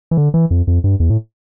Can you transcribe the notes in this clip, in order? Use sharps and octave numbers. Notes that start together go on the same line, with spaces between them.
E3
D3
E3
F2
F2
G2
E2
A2